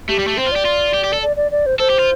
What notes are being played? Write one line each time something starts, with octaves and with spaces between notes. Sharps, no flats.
A3 G4
G3
A3
C4 C5
F4
G4 D5
F4
G4
G4
A4
D5
D5
D5
C5
A4 C5
G4
F4